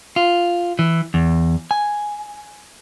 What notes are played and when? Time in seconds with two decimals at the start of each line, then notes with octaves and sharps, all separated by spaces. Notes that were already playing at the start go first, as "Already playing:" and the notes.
0.16 F4
0.79 E3
1.14 E2
1.71 G#5